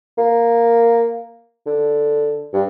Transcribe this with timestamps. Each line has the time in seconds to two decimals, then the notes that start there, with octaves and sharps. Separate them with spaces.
0.18 A#3
1.66 D3
2.53 G2